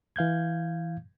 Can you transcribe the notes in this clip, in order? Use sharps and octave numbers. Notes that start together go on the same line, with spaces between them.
E3 F5 G6 G#6